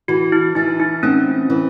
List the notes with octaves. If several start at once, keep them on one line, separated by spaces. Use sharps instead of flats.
E3 F#4
E4
E3 D#4
D#4
C4 C#4
E3